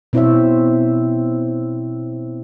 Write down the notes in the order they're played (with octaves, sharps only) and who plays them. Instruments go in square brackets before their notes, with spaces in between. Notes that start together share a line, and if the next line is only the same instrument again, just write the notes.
[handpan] B2 C4 E4 C5 C#5 E5